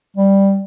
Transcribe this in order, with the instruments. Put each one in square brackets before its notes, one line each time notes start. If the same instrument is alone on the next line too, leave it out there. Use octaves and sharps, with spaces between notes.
[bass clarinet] G3